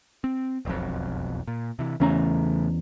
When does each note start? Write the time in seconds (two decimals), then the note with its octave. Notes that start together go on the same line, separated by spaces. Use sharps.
0.24 C4
0.65 E1 B1 F2
1.48 A#2
1.79 C3 E3
2.00 E2 C#3 A3 C#4 A#5